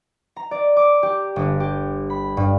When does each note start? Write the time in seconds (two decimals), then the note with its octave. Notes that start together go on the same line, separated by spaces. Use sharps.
0.36 A#5
0.51 D5
0.77 D6
1.03 G4
1.36 G1
1.60 G4
2.10 B5
2.37 G2